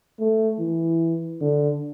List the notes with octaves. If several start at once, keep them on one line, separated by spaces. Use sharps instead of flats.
A3
E3
D3